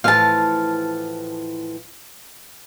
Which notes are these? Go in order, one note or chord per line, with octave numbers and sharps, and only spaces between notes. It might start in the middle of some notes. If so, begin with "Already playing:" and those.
A2 E3 F3 F5 A5